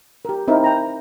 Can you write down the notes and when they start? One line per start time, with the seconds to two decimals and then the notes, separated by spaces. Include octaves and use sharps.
0.25 G4 A#4
0.48 C4 D#4 E4 A#4
0.64 A#4 G5 A#5